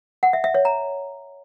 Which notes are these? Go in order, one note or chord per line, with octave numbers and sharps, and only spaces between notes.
F#5
E5
E5
C#5
A#5